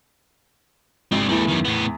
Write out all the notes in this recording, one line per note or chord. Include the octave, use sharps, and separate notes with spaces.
G#1 C4 D4
E2 G3 A3 E4
F#2 D#3
A2 B3